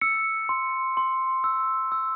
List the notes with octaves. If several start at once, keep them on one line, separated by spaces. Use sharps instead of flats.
E6 C#7
C6
C6
E6
E6